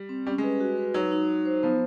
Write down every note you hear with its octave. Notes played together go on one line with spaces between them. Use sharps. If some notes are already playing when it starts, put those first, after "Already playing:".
Already playing: G3
C4
G3 C#4
G#3
B4
F#4
B4
F#3 D#4
D#4
D#4
C5
F3 B3